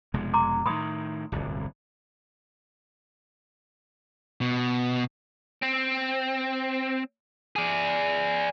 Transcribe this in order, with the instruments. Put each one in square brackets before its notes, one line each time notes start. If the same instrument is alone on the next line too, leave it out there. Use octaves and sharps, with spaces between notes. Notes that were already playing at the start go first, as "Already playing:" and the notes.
[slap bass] F1 B2 G#3
[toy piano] A#5 C6 D6
[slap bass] A2 D#3 [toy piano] B5 C6 D#6
[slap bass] D1 G1 C2
[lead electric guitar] B2
[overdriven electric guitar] C4
G#4 D5